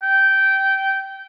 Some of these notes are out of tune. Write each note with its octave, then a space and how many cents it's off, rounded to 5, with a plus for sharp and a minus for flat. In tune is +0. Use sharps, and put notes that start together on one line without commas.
G5 -15